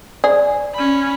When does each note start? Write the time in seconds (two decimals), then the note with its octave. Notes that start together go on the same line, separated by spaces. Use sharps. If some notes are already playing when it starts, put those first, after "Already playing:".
0.24 G#4 D5
0.74 C#4 B5